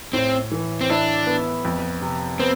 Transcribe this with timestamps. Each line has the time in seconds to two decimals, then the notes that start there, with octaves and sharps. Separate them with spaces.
0.13 A2 C4
0.52 E3
0.81 C4
0.90 D4 E4
1.27 B3
1.65 F2
2.02 C3
2.40 B3 C4